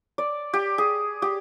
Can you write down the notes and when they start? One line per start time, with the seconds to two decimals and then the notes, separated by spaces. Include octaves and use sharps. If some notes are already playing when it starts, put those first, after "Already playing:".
0.18 D5
0.54 G4
0.78 G#4
1.22 G4